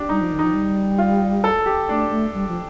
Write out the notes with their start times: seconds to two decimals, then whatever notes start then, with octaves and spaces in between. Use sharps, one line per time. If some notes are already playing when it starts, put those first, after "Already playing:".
Already playing: D4 G4
0.09 G3 D#4
0.20 F3
0.32 D#3
0.39 F3 D#4
0.54 G3
0.98 F4
1.44 A4
1.66 G4
1.89 A3 D4
2.10 A3
2.34 G3
2.48 F3